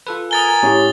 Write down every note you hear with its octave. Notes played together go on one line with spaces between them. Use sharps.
F4 A4 B4
A#4 G#5 D#6 A6 G7
A2 C#4 E4 G4